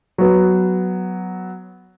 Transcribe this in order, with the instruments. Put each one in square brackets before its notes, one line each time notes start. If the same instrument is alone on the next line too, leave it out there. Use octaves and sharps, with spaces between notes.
[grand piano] F#3 B3